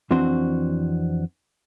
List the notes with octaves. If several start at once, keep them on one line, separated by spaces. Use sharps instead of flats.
F2 E3 C4 D4 F#4 C5